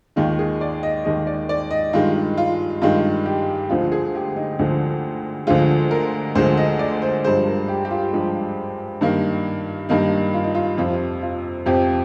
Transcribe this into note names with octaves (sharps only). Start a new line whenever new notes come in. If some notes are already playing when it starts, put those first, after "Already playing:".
D#2 D#3 G#3 F4
G#4
D5
D#5
D#2 D#3 G#3 D#5
D5
D5
D#5
G2 D#3 G#3 F4
F4
G2 D#3 G#3 F4
G4
D2 D3 F3 G#3 F4
G#4
G4
D#4
D2 D3 F3 G#3
D2 D3 F3 G#3 F4
A#4
D2 D3 F3 G#3 C5
D#5
D5
C5
G2 F3 G#3 C5
A#4
G4
G4
F4
G2 F3 G#3
G2 D#3 A#3
G2 D#3 A#3 D#4
F4
D#4
F4
F2 C3 F3 F4
F4
F2 C3 F3 G4